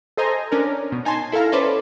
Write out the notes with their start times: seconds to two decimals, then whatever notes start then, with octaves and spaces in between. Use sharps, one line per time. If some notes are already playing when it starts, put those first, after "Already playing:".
0.17 A4 C5 D#5 G#5 A#5
0.52 C#4 D4 A#4
0.92 B2
1.05 D#4 G#5 A5 C6
1.32 E4 A4 A#4 F5 A#5
1.52 C#4 A4 B4 C5 D5